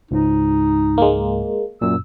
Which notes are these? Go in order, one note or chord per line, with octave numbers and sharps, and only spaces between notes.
C#2 G#2 D#4
G#3 A#3
F#2 A#2 E6